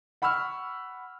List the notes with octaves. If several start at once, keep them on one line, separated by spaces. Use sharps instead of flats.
F#5 B5 C#6 E6 F6